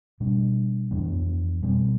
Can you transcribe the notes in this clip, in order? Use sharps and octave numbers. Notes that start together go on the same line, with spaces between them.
B2 G3 D4
F2 E3 B3 D4
B2 G3 C4